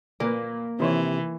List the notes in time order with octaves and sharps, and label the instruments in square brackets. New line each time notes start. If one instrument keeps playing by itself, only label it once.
[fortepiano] A#2 B4 [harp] A#3
[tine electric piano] C3 [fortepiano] D#3 C5 C#5 [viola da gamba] E3